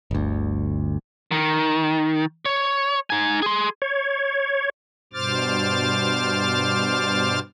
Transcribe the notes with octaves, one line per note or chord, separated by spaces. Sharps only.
G1 D2
D#3
C#5
D#4 G#5
G#4 C6
C#5
G2 B2 C5 D6 F6 A6